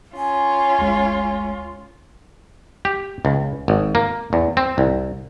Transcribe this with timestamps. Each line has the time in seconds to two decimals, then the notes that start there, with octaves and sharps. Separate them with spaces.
0.17 C#4 F4 G#5
0.79 G1 D2 G#3
2.85 G4
3.25 C#2
3.68 G#1
3.95 A#3
4.33 E2
4.57 C4
4.78 C2